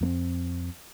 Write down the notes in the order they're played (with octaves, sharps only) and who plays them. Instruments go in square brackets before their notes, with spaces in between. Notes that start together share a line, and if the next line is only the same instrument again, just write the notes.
[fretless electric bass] F2 A#3 C4